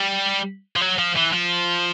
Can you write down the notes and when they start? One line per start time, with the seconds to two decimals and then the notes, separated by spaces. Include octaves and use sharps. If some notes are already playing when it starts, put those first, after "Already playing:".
Already playing: G3
0.76 F3
0.81 F#3
0.98 F3
1.16 E3
1.33 F3